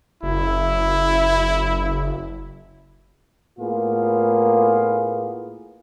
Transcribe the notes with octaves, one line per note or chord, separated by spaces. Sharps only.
F#1 E4
A2 A#3 B3 F4 G#4